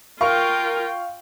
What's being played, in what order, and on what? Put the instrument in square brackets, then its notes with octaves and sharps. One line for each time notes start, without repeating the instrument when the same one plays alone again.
[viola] F4 G5 [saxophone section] A#4 [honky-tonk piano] F5 C#6